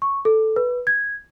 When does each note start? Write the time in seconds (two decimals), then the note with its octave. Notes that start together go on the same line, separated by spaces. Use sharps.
0.02 C#6
0.25 A4
0.56 B4
0.87 G#6